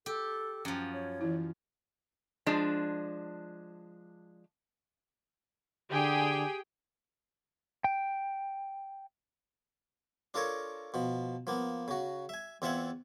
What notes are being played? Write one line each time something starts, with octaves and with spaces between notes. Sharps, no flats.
G4 A4
F#2 F3 G5
C#5
E3 E4
F3 G#3 D4
D3 G4 G#4 G5
G5
D4 F4 A4 A#4 C#5
B2 F3
F3 A#3 B3
C#3 F#4
E5 G#5
E2 C4 F4 E5 F#5 G#5